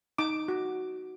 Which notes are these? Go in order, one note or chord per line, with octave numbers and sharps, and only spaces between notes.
D#4 D6
F#4